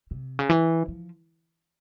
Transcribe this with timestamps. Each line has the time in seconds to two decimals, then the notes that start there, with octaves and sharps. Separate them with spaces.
0.11 C3
0.39 C#3
0.50 E3
0.88 F3